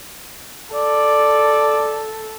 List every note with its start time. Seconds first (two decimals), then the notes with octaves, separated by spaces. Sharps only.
0.74 A4 D5